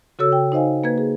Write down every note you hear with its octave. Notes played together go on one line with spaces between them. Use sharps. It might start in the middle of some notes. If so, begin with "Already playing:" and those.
C#3 F#4 A4 C#5 E6
G5
D#4 C5 D#5 F5 G#5
A#3 B4 G#6
G#4